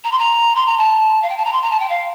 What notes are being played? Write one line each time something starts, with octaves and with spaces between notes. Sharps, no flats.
A#5
C6
A#5
C6
A#5
A5
F5
G5
A5
A#5
C6
A#5
A5
G5
F5